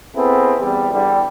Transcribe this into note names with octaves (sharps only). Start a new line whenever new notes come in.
B3 C4 E4 G#4 A4 B4
E2 G3
E2 D3 G3